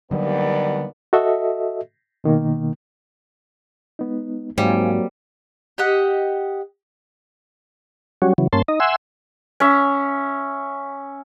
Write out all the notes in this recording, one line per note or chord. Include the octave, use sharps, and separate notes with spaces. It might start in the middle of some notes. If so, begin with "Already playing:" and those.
D#2 D3 F#3 G3 B3 D5
F#4 A4 D#5 E5
B2 D#3 A#3
G#3 B3 D#4
G#2 F#3 G3 A#3 C4 C5 F5 G#5
G4 D#5 F#5
F#3 G3 C#4 F#4
C#3 E3 F#3
G2 A#3 C#4 A5 C6
D#4 D#5
E5 F#5 G#5 C6 E6
C#4 E5